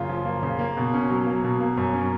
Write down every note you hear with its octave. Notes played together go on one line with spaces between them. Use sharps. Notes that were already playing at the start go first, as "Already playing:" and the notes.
Already playing: F#2 C#3 A#3 F4
F3
A#3
C#3
A#3
B2
C#4
F#3
A#3
B2
A#3
F#2
C#4